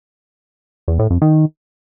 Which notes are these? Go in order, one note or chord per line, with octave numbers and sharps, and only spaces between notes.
E2
A2
F2
D#3